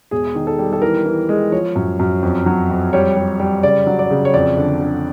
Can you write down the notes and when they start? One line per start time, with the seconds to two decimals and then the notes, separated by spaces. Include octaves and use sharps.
0.11 E1 G#4
0.35 D#3
0.47 A4
0.59 G3
0.73 A4
0.82 E3 A#4
1.06 E3
1.29 G#3
1.52 F3 C#5
1.76 F#2
1.99 F#2
2.23 F2
2.46 F#3
2.70 F2
2.93 G3 C#5
3.17 G3
3.40 G3
3.63 C#3 D5
3.87 F#3
3.99 D5
4.10 C#3
4.25 C#5
4.34 F2 D5
4.57 D3
4.81 D3